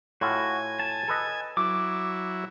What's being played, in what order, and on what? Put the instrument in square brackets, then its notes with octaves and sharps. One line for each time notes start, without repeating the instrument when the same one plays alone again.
[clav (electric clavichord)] A2 F4 E5 [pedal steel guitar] F#4 [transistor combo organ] G#5
[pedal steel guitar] A5
[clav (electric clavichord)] A4 B4 D#5
[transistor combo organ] F#3 E4 [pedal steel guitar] D6